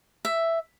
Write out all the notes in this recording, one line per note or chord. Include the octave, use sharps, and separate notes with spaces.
E5